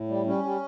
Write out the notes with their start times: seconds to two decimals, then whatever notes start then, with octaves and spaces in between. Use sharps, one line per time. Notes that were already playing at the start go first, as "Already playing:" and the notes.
Already playing: A2
0.09 G3
0.26 G3 C#4
0.43 G3